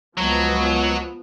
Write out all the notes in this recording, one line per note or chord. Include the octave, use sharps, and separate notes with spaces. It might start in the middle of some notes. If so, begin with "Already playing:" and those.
C#2 F3 F#3 B3